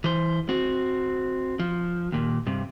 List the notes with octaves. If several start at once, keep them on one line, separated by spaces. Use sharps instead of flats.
E3 C5
C4 F#4
F3
D#2 A#2
G2 C3